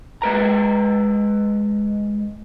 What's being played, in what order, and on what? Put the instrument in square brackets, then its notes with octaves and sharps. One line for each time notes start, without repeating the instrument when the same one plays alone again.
[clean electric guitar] G#3 B4 A#5